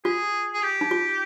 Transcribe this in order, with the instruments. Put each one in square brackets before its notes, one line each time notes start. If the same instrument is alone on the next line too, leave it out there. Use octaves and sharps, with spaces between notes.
[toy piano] F4 [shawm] G#4
[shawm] G#4
G4
[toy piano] D#4
F4